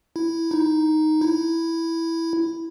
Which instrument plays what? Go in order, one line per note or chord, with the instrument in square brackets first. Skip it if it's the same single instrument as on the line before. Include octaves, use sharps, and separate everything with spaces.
[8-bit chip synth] E4
D#4
E4